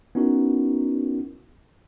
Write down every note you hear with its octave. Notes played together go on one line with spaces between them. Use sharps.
B3 C#4 D#4 E4 F#4 A#4